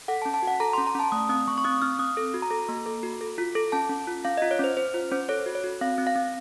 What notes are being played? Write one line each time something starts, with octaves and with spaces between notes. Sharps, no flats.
A4 F#5
A5
C#4
A5
F#4 F#5
A4 A#5
C6
C#4
A#5
C#4 A5
A3 D#6
C4 D#6
A3 C#6
C#6
C4 D#6
C4 F6
C4 D#6
A4
F#4
A#5
A4
A#3
A4
F#4
A4
F4
A4
C#4 A5
C#4
F4
C#4 F5
D#5
F4
C#5
C#4 C5
C#4 C5
F4 C5
C#4 C5
A4 C#5
F#4
C#5
F#4
C4 F5
C4
F5
C4